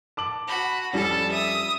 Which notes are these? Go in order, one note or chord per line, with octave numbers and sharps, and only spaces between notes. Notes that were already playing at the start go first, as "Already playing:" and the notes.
A5 D6 F#7
F#4 B5
F2 G3 C#4 A4 A5
E5 D#6